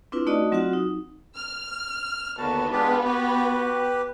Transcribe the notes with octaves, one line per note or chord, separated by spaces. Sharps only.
C4 D4 E4 F4 B4
A3 D#4 F#4 D5 D#5
F#3 C4 F4 F#4 F#5
D#4
F6
D#2 D3 B3 F#4 A5
G#3 D4 F4 G4 B4
F#4 G4 B4